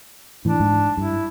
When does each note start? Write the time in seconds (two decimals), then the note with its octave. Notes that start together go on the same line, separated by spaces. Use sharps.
0.45 A2 E3 D4
0.60 G#2
0.97 G2 E4